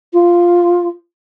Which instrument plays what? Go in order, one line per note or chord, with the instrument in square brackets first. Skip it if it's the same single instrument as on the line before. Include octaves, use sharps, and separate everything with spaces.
[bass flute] F4